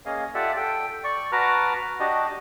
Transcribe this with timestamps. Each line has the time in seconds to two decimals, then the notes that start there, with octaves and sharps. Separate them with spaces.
0.06 A#3 C#4 G#4 D#5 F5
0.35 F4 G4 A4 D5 E5 F#5
0.56 A4 G5
1.04 D5 C#6
1.32 F#4 B4 A5 A#5 D6 F6
2.00 D4 F#4 G4 D#5 A5